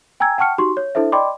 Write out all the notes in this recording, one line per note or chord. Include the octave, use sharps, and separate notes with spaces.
G5 G#5 A#5 E6 G#6
F#5 G5 A5 C#6 F6 C#7
D#4 F#4 G4 C6 C#6
C#5
D4 E4 A4 C5 E5
D5 D#5 G5 B5 C6 D6